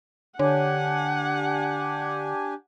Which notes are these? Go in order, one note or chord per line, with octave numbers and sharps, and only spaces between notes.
D3 D4 G4 C#5 F#5 G#5